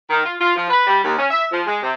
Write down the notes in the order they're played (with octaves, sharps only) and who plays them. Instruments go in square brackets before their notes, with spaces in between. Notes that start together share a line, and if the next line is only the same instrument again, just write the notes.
[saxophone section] D#3
F4
F4
F3
B4
G3
D#2
C#4
E5
F3
G#3
C3